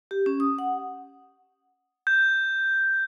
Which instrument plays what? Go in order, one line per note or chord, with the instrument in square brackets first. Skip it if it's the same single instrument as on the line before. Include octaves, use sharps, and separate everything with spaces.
[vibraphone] G4
C#4
D#6
F#5
[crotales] G6